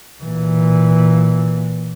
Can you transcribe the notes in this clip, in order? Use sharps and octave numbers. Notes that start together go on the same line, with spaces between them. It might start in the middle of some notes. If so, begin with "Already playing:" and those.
A#2 E3